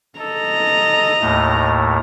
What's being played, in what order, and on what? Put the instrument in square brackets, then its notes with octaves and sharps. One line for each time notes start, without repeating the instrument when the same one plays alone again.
[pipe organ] A4 [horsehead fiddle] D#5 A#5
[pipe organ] D#2 A2 A3